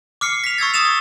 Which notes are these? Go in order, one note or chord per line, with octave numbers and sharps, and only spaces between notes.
D6 F6 C7 C#7
B6 F7
C#6 E6 G#6 A6
C#6 D#6 A6 E7 F7